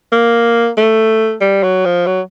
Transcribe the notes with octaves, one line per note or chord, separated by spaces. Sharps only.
A#3
A3
G3
F#3
F3
F#3